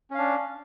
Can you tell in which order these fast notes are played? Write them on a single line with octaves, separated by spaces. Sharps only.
C#4 F5 D4